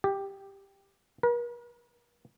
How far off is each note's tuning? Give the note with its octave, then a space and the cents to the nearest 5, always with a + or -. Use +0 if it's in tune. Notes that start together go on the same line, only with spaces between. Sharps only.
G4 +5
A#4 +45